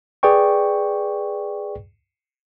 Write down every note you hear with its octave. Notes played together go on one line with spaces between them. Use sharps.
G#4 B4 D5 G5 C#6